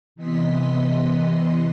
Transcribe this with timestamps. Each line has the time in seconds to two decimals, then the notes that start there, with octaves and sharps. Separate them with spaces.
0.16 C3 E3 B3 D#5 C6 B6